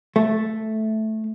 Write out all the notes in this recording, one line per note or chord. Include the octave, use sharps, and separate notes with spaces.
A3